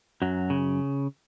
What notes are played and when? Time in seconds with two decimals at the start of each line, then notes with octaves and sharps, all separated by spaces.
0.22 F#2 F#3
0.50 C#3